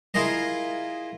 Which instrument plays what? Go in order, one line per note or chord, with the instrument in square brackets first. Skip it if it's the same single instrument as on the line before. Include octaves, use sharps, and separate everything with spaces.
[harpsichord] E4 F4 G#4 A#4 D#5